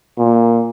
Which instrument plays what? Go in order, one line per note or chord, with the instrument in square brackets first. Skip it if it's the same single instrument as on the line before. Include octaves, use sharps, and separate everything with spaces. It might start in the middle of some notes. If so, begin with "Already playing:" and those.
[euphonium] A#2